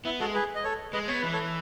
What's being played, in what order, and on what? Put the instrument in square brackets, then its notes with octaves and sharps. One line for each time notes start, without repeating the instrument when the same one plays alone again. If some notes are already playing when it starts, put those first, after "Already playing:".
[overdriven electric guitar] B3 [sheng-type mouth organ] E4
[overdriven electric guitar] G#3 [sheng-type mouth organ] F#4 A4
[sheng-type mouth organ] G#4 B4
D#5
A4 C#5
[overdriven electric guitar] G#3 [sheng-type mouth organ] B4 D#5
[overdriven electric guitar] B3 [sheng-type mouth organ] C#5
[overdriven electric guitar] E3 [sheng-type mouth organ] B4
[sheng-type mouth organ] A4 C#5